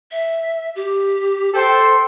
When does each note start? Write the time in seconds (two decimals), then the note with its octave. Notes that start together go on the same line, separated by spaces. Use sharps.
0.11 E5
0.76 G4
1.55 A4 C5 G5 C6